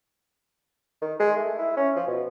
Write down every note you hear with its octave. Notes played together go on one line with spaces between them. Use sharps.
D#3
G#3
A3
E4
C#4
F3
B2